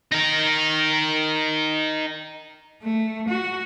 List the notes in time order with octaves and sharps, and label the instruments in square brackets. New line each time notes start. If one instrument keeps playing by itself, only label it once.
[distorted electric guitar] D#4 A#4
[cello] A3
F#4